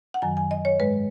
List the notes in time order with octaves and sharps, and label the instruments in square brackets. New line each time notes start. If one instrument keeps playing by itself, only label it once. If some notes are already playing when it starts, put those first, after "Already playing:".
[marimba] F#5
F#2 D#3 F#3 G#5
G#5
D#5
C#5
G#2 G#3 B4